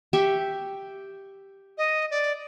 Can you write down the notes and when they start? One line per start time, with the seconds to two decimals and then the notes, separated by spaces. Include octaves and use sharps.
0.13 G4 E5 C#6
1.78 D#5
2.11 D5